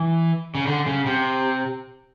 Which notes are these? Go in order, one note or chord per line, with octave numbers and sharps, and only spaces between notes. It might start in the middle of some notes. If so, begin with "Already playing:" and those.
Already playing: E3
C#3
D3
C#3
C3